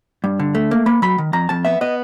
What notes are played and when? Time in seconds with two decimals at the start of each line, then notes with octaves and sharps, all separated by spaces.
0.24 G2
0.40 D3
0.55 A3
0.71 A#3
0.86 A#3 B5
1.02 F#3 B5
1.18 D#3
1.33 F2 A#5
1.49 F2 A5
1.65 B3 E5
1.81 B3 D#5